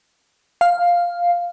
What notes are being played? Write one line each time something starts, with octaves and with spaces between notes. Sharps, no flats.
F5